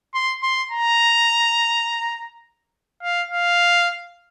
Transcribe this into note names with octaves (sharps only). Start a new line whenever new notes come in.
C6
C6
A#5
F5
F5